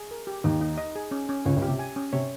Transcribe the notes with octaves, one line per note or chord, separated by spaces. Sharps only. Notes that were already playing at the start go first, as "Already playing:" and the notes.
Already playing: G#4
A#4
G4
D#2 D#3 D#4
D#4
D#5
G#4
C#4
C#4
C#2 C#3 C#5
C#2 C#3
G4
C3
G#5
C#4
C3 C#5